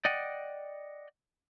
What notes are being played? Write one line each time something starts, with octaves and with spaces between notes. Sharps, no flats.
D5 D#5 F#5 G5